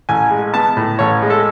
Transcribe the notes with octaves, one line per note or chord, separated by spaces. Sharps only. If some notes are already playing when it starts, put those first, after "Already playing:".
A1 G#5
G#3
B3 A5
A2
A1 C#5
G#3
A4